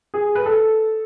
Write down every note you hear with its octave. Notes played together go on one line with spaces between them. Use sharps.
G#4
B4
A4